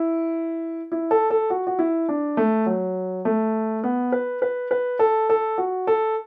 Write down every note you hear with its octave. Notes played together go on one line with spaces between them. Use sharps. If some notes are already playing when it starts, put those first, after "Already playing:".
Already playing: E4
E4
A4
A4
F#4
F#4
E4
D4
A3
F#3
A3
B3
B4
B4
B4
A4
A4
F#4
A4